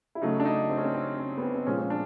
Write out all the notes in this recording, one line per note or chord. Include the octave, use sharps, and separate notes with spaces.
E4
C#3 F#3 A3 D#4
D4
D#4
C4
C#4
C4
C4
C#4
B3
C4
C4
A#2 F3 G#3 C#4
C#4
D4